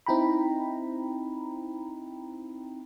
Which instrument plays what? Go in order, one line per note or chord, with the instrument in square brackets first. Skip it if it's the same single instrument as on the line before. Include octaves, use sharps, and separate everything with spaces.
[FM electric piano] C4 D#4 E4 G5 A#5 B5